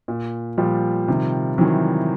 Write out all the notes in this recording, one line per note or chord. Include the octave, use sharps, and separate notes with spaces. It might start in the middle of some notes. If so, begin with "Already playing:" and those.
A#2
A#2 F3 G3
C3 D#3
C3 D#3 E3 F#3